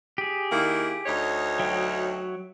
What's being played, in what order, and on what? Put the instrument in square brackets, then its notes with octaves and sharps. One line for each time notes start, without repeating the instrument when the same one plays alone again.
[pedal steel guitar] G4 G#4
[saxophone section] D#3 A#3 E4
D2 D#4 C#5
[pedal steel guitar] F#3 E5 G5